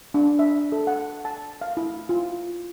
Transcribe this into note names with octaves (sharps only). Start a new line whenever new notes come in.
D4
E5
A4
F#5
A5
F5
E4
F4